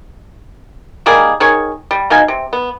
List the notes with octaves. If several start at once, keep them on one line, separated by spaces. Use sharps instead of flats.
D#3 G3 A#3 G#4
D#3 G#4 C#5 G#5
G3
B2 D#4 F5 G#5
C3
B3